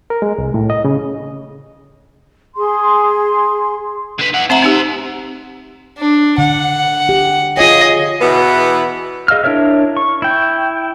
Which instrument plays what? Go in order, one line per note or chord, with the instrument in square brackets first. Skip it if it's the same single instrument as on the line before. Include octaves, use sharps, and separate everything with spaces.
[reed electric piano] A#4
G#3
C2
A2
D#5
C#3
[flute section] G#4 C6
[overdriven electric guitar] D3 B4
E4 F#5
[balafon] C4 E5 A#5 [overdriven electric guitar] C5 F#5
[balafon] C4 D#4 G4
[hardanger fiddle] D4
[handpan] D3 [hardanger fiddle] F#5
[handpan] G4
[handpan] F4 C#5 [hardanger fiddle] G#4 D#5
[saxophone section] E2 B2 E3 B3
[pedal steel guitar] G#4 D#5 F5 E6 F6
D4 E4 A#4 C#5 E5
C#6
E4 G5